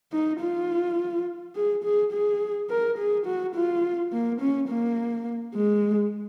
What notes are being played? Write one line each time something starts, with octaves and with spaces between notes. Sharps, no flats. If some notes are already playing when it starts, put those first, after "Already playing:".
D#4
F4
G#4
G#4
G#4
A#4
G#4
F#4
F4
A#3
C#4
A#3
G#3